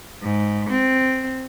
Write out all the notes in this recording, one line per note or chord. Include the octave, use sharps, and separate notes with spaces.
G#2
C4